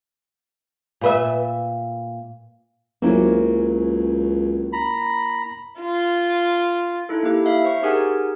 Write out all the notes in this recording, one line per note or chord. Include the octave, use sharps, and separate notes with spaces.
A#2 B4 E5
C#2 F#3 A#3 C4 C#4 E4 A#4
A#5 B5
F4
D#4 E4 A4
A#3 E4 G4
E5 F5
C5 C#6
D#4 G4 G#4 A#4 F#5 G#5